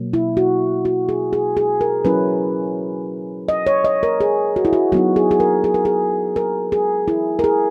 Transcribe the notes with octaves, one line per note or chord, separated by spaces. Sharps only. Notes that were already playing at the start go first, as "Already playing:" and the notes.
Already playing: B2 F#3 A#3
E4
F#4
F#4
G#4
G#4
G#4
A#4
F#3 C#4 E4 B4
D#5
C#5
D#5
A#4
G#4
F#4
E4
F#4
F#3 B3 D#4 F#4
G#4
G#4
A#4
G#4
A#4
G#4
A#4
G#4
E4
A#4
G#4